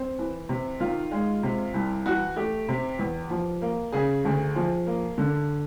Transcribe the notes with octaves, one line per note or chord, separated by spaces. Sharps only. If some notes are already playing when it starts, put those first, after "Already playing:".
Already playing: C4
E3
C3
D#3 F4
G#3
C3
C2
E3 F#4
A3 G4
C3
E2
F3
A#3
C#3 G#4
D2
F3
A#3
D3